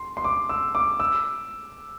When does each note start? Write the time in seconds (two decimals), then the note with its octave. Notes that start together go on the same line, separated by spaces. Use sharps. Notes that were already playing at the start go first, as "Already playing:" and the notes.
Already playing: C6
0.17 C6
0.24 D6
0.49 E6
0.75 D6
1.00 E6